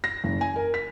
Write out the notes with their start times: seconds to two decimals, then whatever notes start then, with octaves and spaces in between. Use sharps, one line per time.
0.04 A#6
0.24 F#1
0.41 G#5
0.56 A#4
0.74 B6